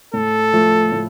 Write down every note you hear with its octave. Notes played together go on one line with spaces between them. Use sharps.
A2 A4
F3 A3
A2